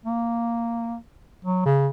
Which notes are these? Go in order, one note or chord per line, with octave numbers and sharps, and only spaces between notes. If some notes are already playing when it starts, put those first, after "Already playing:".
A#3
F#3
C#3